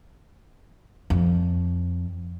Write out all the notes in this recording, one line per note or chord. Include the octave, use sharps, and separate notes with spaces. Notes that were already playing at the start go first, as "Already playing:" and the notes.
F2